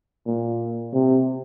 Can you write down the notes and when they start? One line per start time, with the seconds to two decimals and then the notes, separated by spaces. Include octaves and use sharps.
0.27 A#2
0.94 C3